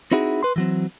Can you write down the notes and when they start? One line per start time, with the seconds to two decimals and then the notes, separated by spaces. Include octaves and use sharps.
0.12 C4 D#4 E4 F#4 G#4
0.43 B4 C6
0.56 E3 F#3 C4